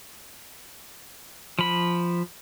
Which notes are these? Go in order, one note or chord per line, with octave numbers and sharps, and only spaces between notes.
F3 B5